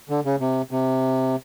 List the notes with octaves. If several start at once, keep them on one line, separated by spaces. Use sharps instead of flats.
D3
C#3
C3
C3